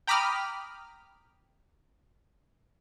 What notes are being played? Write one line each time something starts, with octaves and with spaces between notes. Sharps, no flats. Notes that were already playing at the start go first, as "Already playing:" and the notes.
G5 A#5 B5 D6 D#6 F6